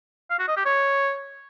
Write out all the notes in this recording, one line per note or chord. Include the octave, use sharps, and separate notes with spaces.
F5
F#4
D#5
G4
C#5